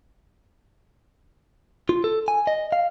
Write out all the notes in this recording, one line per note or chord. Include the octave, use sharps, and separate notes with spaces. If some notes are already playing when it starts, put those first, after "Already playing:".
F4
A4
G#5
D#5
F5